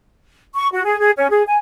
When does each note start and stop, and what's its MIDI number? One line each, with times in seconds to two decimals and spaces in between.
0.55 0.68 85
0.73 0.83 66
0.85 0.97 68
0.99 1.11 68
1.17 1.28 61
1.30 1.43 68
1.48 1.57 80